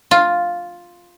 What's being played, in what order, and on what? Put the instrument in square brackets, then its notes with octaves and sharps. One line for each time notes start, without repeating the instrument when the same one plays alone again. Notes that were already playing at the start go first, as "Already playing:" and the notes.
[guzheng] F4